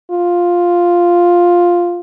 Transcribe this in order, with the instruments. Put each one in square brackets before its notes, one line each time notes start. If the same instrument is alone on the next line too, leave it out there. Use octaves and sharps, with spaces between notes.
[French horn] F4